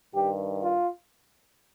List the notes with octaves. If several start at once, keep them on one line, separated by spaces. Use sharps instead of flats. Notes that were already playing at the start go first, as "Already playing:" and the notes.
G2 D#3 G4
F4